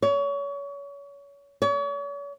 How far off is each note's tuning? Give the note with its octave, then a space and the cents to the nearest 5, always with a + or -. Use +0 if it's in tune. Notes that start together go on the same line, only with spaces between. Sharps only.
C#5 +30
C#5 +40